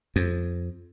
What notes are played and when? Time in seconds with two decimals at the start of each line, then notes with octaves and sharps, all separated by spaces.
0.16 F2